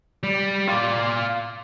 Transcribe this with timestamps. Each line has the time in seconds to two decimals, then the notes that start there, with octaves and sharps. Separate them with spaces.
0.23 G3
0.69 F4 D5